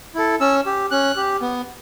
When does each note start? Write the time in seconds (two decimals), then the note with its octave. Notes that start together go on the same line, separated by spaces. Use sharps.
0.15 E4 A4
0.40 C#4 E6
0.66 G4
0.91 C#4 F#6
1.16 G4
1.41 B3